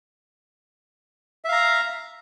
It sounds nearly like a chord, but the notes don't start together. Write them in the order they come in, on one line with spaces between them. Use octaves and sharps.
E5 F5 A#5